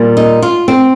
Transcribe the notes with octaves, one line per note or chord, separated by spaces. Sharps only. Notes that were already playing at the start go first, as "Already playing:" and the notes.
Already playing: A#2 G3 A#3
D#4
F4
C4